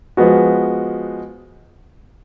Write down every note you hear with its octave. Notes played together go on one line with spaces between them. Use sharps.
F3 G#3 B3 F#4